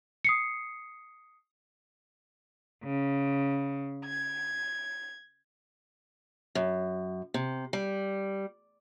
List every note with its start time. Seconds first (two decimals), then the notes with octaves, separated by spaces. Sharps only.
0.24 D#6 C7 C#7
2.83 C#3
4.06 G#6
6.55 F#2
7.34 C3
7.73 G3